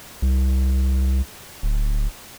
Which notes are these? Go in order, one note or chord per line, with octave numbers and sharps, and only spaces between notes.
C2
D1